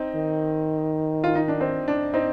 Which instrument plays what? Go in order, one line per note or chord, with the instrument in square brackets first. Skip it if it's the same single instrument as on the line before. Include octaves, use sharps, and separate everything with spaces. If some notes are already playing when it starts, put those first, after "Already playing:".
Already playing: [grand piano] C4 D#4
[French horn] D#3
[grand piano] F4
D#4
D4
C4
D4
C4 D#4